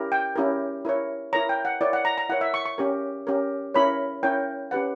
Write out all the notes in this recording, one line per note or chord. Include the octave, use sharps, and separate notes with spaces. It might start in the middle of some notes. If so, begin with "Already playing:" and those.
Already playing: C#4 E4 G4 A#4
G5
C#4 E4 G4 A#4
E4 A#4 C#5
E4 A#4 C#5 A#5
G5
F#5
E4 A#4 C#5 D5
F#5
A#5
A#5
E4 A#4 C#5 F#5
E5
C#6
C#6
C#4 G4 A#4
C#4 G4 A#4
C#4 E4 A#4 C#5 B5
C#4 E4 A#4 C#5 G5
C#4 G4 B4 F#5